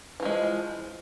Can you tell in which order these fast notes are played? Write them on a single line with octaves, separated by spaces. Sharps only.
E3 F3 G#3